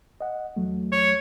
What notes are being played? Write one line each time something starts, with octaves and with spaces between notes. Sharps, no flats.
D#5 F#5
E2 F#3 A3
C#5